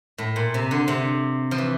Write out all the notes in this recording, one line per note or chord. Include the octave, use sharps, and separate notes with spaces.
A2
A#2
C3
D3
C3
F3
E3